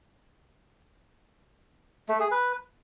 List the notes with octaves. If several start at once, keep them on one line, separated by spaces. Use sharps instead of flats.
A3
G#4
B4